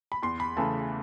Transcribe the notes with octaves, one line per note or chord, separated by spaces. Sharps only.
B5
E2 C6
B5
C#3 E3 A3 A5